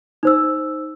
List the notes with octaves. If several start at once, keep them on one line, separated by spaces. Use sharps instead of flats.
D#4 C5 E6